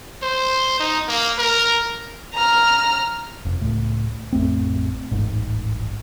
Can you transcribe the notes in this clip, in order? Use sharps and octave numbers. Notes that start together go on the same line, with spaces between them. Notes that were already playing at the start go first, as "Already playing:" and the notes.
C5
D#4
A#3
A#4
A#5 F6
F1
C#2 A2
A1 F2 A3 C4
D1 A1 G#2